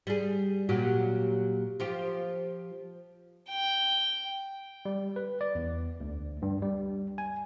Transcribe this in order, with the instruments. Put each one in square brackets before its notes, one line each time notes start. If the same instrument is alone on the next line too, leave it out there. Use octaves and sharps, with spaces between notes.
[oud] G3 G#4
A#2 F#3 G4
F3 F4 G4
[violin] G5
[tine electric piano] G3
B4
D5
E2
D2
G2
G3
G#5